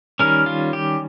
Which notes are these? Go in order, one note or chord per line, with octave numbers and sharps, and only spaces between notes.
D#3 G3 C#4 A#4
F4
G4